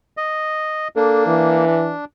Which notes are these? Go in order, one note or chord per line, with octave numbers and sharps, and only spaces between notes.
D#5
A#3 D4 A4
E3
D4